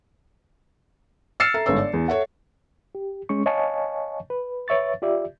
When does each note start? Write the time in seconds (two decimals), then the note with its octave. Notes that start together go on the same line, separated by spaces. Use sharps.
1.40 E6 F6 A6 C7 C#7 E7
1.54 A4 E5 A#5
1.66 G1 G#2 B4 C#5 E6
1.78 D5
1.93 E2
2.08 A4 C#5 E5 F#5
2.95 G4
3.29 G#3 C#4 C#6
3.46 C#5 D#5 F5 G#5 A5 C#6
4.30 B4
4.68 B4 C#5 E5 C#6 A6
5.02 F4 G4 D5 E5